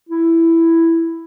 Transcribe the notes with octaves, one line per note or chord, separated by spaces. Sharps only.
E4